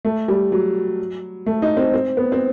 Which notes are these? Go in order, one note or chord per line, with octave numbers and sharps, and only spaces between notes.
A3
G3
F#3
A3
D#4
C4
C4
B3
C4